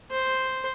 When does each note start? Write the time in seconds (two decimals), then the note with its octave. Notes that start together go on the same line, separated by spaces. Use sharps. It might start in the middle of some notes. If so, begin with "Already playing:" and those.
0.11 C5